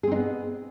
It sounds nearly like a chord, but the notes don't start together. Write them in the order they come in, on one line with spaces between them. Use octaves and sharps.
G#4 C4 D#4 B3